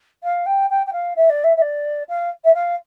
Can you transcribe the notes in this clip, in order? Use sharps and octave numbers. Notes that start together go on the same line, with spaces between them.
F5
G5
G5
G5
F5
E5
D5
E5
E5
D5
F5
E5
F5